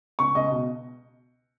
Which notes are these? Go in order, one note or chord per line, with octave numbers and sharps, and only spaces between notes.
C#2 C#6
C#2 D#5
B2